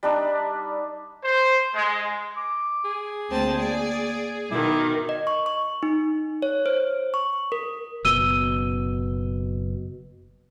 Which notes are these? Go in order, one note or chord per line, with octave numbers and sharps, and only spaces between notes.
G3 D4 D#4
C5
G#3
D6
G#4
D2 A#3 C4 A5
D5
B2 D#3 E4 D6
D#5
C#6
C#6
D#4
C#5
C5
C#6
A#4
F#1 B2 E6 D#7 G7